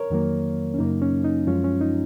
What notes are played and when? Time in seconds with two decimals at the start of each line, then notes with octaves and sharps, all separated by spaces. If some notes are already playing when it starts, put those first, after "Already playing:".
Already playing: A#4 C#5
0.10 F2 D#3 F#3 A#3
0.74 C#4
0.78 F#2 C#3 F#3 A#3 D#4
1.02 C#4
1.24 D#4
1.47 F#2 F3 G#3 C#4 F4
1.64 C#4
1.81 D#4